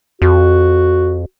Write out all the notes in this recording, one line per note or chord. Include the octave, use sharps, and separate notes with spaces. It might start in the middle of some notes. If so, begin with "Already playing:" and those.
F2 F#4